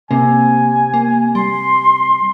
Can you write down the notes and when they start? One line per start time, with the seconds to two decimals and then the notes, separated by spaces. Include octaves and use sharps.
0.11 C3 A#3 G#5
0.94 A#3
1.35 G3 C6